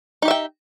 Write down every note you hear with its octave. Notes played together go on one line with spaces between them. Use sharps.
D#4 G4 E5 G5